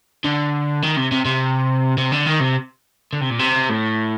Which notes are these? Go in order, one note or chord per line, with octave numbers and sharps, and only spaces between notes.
D3
D#3
C3
C3
C3
C3
D3
D#3
C3
D3
C3
A#2
C3
A2